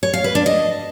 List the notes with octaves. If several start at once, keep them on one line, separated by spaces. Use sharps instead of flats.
C#5
F5
B4
D4
D#5